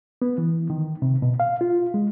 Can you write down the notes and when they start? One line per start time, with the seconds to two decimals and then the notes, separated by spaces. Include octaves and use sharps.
0.22 B3
0.38 E3
0.70 D#3
1.02 C3
1.22 B2
1.40 F5
1.61 F4
1.94 G#3